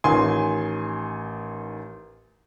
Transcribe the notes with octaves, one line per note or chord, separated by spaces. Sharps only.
A1 D#3 G#5 C6